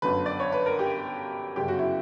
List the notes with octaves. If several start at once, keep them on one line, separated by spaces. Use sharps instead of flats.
G1 F#2 D3 B4
D5
C#5
B4
A#4
G4
G1 F#2 C#3 G4
F#4
E4